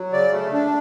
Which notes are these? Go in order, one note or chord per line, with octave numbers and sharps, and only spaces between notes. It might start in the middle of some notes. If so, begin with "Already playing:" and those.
Already playing: F#3
C#3 D5
A3
D4